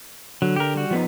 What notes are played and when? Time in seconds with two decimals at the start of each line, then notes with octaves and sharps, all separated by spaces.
0.42 D3 F#3
0.56 G4 A#4
0.75 G3 F#4
0.91 F3 B3 D#4